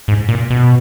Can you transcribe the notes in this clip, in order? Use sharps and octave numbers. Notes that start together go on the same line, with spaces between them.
G#2
A#2
B2